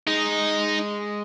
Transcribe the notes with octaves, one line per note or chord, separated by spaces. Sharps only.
G#3 D#4